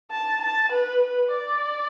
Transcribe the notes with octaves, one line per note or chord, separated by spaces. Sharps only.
A5
A5
B4
B4
D5